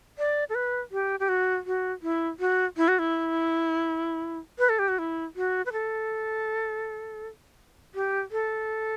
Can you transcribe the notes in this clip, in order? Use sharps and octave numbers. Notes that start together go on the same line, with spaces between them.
D5
A4
B4
G4
G4
F#4
F#4
E4
F#4
E4
F#4
E4
B4
A4
G4
F#4
E4
F#4
B4
A4
G4
A4